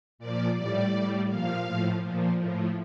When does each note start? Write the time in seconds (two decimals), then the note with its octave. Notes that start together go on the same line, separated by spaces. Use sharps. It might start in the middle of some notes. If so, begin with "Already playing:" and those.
0.19 A#2 F3 D5
0.55 A2 G3 D5
0.91 A2 G3
1.28 A#2 F3 F5
1.65 A2 F3
2.00 A#2 F3
2.38 A2 F3